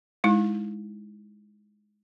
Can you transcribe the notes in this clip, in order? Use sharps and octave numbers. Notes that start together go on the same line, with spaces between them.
G#3 D#4 E4